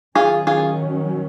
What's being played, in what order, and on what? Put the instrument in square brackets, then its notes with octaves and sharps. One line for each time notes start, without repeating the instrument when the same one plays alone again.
[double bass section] D#3 F#3 C#4 [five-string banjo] F4 G#4
[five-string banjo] F4 G#4